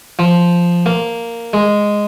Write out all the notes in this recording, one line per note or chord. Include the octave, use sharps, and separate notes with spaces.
F3
A#3
G#3